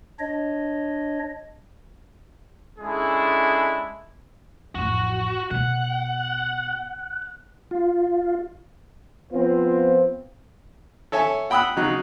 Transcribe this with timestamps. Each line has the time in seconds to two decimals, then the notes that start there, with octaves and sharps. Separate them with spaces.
0.19 D4 C#5 D#5
2.79 G#3 C#4 D4 E4 G#4 A4
4.75 A1 F2 F#4
5.51 B2 F#5
7.71 F4
9.33 F3 B3 C4 F4 C5
11.12 A4 C#5 E5 G#5
11.50 F#5 G5 B5 D#6 E6 F#6
11.77 C#3 F#3 D#4 F#6